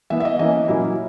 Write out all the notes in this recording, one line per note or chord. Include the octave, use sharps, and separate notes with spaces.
E3 B3 E5
E5
D#5
E3 A#3 C#4 D#5
A#2 F#3 A#3 C#4 E4